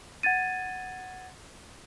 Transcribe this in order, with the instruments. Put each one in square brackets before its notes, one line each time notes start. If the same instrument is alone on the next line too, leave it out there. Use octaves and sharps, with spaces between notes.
[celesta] F#5 G#6 A6 D#7